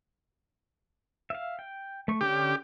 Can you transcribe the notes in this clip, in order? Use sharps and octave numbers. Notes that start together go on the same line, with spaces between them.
E5 F5
G5
A3 C#6
D3 C#4 D4 G4